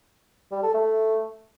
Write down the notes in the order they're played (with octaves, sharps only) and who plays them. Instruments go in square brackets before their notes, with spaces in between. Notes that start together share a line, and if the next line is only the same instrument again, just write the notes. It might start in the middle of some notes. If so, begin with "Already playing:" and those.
[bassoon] G3
A4
A3